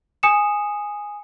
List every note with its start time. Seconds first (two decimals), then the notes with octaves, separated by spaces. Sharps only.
0.23 G#5 D#6 C#7 E7